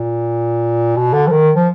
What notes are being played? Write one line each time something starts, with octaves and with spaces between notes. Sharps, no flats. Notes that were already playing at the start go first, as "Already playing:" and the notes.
Already playing: A#2
B2
D3
F3
D#3
F3